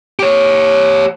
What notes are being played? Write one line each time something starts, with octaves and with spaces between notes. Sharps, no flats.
G4 C#5